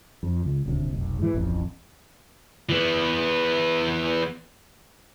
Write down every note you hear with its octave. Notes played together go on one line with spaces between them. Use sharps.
F2
C#2
D#1 D2 C3
F1 B1
G#2 E3
D1 A1 F2
E3 B3